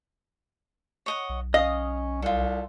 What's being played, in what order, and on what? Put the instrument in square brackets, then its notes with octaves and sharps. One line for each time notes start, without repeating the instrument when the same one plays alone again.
[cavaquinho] C#5 D#5 F#5
[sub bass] B1
[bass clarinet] C#4 [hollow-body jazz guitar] D#5 [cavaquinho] F5 D#6
[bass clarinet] C2 [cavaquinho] F4 A4